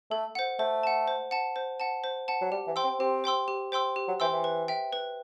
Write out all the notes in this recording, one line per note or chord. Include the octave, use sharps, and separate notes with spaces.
A3 A4
C5 F#5
A3 C5
F#5 A5
C5
F#5 A5
C5
F#5 A5
C5
F#5 A5
F#3
G3 G4
E3
C5 G5 C6 E6
C4
C4 G4
C5 G5 C6 E6
G4
C5 G5 C6 E6
G4
F#3
E3 C5 G5 C6 E6
E3
B4
E5 G5
B4